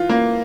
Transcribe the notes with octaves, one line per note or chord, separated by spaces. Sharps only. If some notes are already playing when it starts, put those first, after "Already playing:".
Already playing: E3 F4
A#3